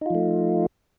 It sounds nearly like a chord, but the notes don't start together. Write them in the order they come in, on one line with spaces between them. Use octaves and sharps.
D#4 F4 F3 A3